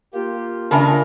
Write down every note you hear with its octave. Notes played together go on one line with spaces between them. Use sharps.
A#3 F4 G4
C#3 D4 A#4 E5 G#5 A5